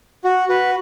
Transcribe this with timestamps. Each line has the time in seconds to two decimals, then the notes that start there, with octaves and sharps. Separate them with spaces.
0.24 F#4
0.49 F#4 B4